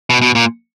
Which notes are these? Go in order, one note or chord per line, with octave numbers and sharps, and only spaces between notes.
B2
B2
A#2